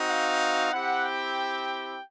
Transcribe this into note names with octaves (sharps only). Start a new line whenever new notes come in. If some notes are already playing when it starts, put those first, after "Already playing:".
Already playing: C4 D#4 F#4
F5
C4 E4 G4 F#5
G5